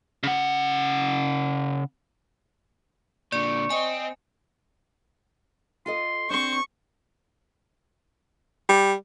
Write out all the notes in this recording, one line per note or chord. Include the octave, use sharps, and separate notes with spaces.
C#3 F#5
A#2 D3 D5 C#6
C4 D#5 G#5
F4 A4 D#5 C6
C4 D4 C5 C#6
G3